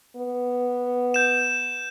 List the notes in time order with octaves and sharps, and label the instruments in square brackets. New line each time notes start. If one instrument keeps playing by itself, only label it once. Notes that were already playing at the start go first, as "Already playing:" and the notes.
[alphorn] B3
[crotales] G6 E7